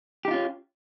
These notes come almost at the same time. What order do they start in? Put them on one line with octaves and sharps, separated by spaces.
G4 D#4 F4 C#4